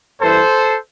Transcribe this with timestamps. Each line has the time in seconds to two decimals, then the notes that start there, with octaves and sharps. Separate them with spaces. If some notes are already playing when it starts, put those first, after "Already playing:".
0.21 G2 E3 B3 A4 C5